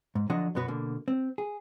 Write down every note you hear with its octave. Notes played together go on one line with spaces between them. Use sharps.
G#2
D3 F3 F#3 D4 D#5 F#5
F#2 B2 B3 F#4 B4
B2 D3 A#3
C4
G#4